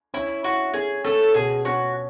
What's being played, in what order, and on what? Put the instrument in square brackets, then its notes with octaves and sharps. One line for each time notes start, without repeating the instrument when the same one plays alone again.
[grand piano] C#4 [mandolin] E4
[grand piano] E4 [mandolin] F#4
[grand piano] C#4 [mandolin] G#4
[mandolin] A3 A4 [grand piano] C#4
[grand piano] B2 [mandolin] G#4
[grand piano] C#4 [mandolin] F#4